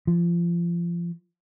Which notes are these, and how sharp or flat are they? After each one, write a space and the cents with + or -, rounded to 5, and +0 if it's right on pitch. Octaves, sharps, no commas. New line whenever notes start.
F3 -25